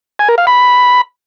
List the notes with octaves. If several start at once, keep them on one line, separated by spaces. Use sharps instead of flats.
G#5
A#4
F5
B5